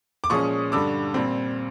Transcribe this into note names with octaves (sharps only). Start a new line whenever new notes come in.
D6
A#2 F3 G#3 C#4 C#6 D#6
G2 D3 G3 D6 E6
A#2 G3 C4